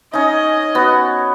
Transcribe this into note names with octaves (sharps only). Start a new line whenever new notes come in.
C#4 D#4 D#5
B3 F#4